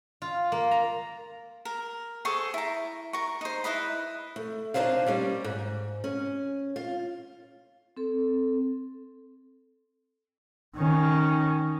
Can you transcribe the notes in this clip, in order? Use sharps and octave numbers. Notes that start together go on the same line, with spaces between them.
F4
A#3
A#5
A#4
G#4 A4 C5 C#6
E4 A#5
A#4 C#6
D#4 C5
E4 B4 D#5 B5
A3
D4 D#4 G#4 C5 C#5 F5
G3 A#3 C#4 D5
G#2
C#4
F4
C4 A4
D#3 C#4